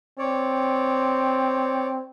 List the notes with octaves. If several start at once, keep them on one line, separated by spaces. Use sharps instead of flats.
C4 C#5 D5